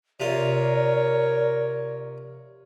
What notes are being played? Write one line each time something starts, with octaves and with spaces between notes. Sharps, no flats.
C3 F4 A#4 C#5 D5